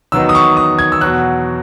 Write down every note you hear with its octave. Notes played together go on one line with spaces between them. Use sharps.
E2 D#3 F#3 B3 D#4 E6
D#6
C#6
D#6
G#6
E6
E2 B2 F#3 F#6